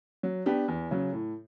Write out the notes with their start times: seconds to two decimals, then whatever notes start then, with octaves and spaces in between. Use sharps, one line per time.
0.23 F#3
0.46 B3 D4 G4
0.68 E2
0.91 C#3 F#3
1.13 A2